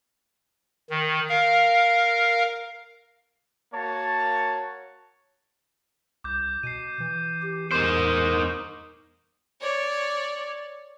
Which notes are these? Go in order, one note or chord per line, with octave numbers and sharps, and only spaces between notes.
D#3
A#4 F5
A#3 F#4 C#5 A5
C2 D6 G6
B2 C7 D#7
E3
G4
E2 D#4 A#4 C5 C#6 D6
C#5 D5